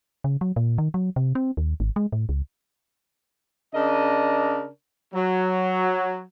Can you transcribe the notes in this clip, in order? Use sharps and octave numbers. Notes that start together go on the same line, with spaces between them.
C#3
F#3
A#2
D#3
F#3
C3
C4
D#2
G#1
G#3
A2
C#2
C#3 D4 A#4 D#5
F#3